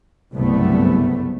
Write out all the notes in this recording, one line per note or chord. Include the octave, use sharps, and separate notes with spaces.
F#1 C2 G2 G3 A3 B3